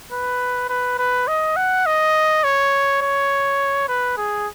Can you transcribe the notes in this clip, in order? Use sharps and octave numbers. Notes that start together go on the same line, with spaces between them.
B4
B4
B4
D#5
F#5
D#5
C#5
C#5
B4
G#4